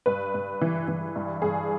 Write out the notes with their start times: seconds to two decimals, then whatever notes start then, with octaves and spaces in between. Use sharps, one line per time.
0.06 G2 B4
0.34 G2
0.61 E3
0.88 E3
1.16 G2
1.42 G2 G#4